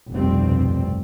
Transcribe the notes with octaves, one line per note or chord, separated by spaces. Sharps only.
F1 C2 G2 B2 G3 C4